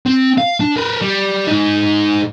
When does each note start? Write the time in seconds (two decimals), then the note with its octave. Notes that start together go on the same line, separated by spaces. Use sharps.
0.06 C4
0.38 F5
0.60 D4
0.77 A#4 B4
1.02 G3
1.47 G#2 D#4